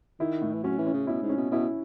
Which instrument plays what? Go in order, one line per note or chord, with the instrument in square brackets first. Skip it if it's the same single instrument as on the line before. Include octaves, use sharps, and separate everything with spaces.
[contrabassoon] D#3 [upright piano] E4
[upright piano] A2
[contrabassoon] E3
[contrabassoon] F#3 [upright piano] C#4
[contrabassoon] E3
[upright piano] C#4
[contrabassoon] C#3
[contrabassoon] B2 [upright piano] E4
[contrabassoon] G#2
[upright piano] C#4
[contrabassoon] B2
[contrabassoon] B2 [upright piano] E4